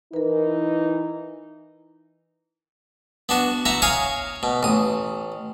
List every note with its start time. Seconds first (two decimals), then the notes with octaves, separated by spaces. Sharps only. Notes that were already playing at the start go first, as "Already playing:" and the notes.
0.14 E3 D#4 A#4 B4
3.29 B3 D4 F#4
3.65 E4 F#4 A#5
3.82 C#5 F5 G#5 A#5 C#6 D#6
4.43 B2
4.63 A1 D#6